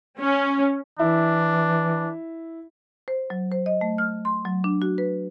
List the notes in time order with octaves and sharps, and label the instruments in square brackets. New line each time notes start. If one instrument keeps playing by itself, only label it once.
[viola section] C#4
[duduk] E3 [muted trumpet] D4 [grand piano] E4
[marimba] C5
F#3
C5
D#5
A3
F6
C6
F#3
D4
F#4
B4